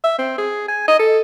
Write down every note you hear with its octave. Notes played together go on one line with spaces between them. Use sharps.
E5
C4
G#4
G#5
D#5
A4